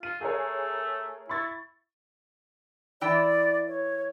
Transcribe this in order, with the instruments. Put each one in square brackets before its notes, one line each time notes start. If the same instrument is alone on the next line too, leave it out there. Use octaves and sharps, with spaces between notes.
[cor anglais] F4 [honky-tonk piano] D#7
[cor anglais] A3 [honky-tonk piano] G#4 A#4 C#5
[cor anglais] E4 [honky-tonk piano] B5 C#6 A6
[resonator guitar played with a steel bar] E3 E4 G5 [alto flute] D5
[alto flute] C#5